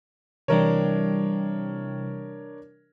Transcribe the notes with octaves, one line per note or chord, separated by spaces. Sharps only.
C3 E3 G3 D4 A#4 C#5